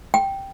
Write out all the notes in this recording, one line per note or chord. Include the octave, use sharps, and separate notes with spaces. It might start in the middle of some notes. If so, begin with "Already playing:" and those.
G5